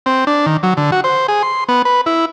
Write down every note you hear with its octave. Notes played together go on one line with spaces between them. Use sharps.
C4
D4
D#3
F#3
D3
F#4
C5
G#4
C6
B3
B4
E4